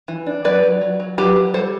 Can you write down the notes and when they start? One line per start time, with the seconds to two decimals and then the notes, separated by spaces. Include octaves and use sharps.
0.08 E3
0.26 D4
0.44 F#3 B4 D5
0.63 F#3
0.81 F#3
1.00 F#3
1.18 F#3 G4 B4
1.36 F#3
1.54 G3 A4 C5